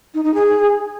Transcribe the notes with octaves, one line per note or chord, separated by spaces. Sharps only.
D#4
D#4
G#4